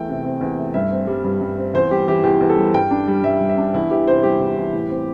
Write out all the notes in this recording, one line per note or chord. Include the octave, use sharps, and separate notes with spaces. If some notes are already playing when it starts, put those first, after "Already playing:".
Already playing: E2 A3 G5
C3
C4
E2
A3
G2 E5
C4
G3
G2
G2
C4
E2 C5
G3 G4
E3 G4
E2 G4
E2
A4
G3
G2 G5
D4
G3
G2 E5
G2
E5
D4
E2 E4
E3 G4
C3 C5
G3 G4
E2
E3
A2
C4